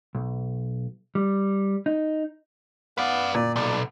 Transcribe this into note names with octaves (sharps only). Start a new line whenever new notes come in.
B1
G3
D#4
B3 B4 D5 F5
A#2 D5
B1 D5